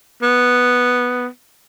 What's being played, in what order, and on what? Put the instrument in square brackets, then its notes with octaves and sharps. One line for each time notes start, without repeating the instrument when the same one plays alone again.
[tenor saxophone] B3